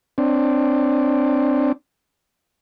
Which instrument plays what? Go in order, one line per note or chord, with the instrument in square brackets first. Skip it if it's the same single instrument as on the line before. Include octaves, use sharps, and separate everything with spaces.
[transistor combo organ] C4 D4